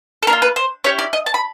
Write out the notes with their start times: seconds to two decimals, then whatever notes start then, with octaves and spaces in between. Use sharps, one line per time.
0.23 A4
0.27 A#3 D4 A#4
0.33 F4
0.42 B4
0.56 C5
0.84 C#4 E4 G4 C#5
0.99 D5
1.13 D#5
1.26 A5
1.34 B5